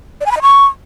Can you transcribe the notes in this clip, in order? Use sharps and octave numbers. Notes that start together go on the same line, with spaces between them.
D5
G#5
B5
D#5
C#6